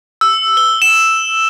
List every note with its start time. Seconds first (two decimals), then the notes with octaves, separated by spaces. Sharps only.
0.21 E6
0.57 G7
0.82 E7